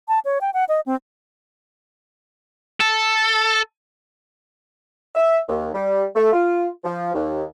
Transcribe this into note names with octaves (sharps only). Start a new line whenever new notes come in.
A5
C#5
G5
F#5
D#5
C4
A4
E5
D#2
G3
A3
F4
F3
D#2